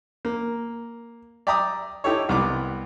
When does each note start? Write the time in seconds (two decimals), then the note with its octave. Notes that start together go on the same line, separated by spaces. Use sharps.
0.25 A#3
1.47 D5 E5 G5 A#5 D6 D#6
2.04 D#4 E4 G4 A4 C#5
2.29 C2 C3 B3 D5 D6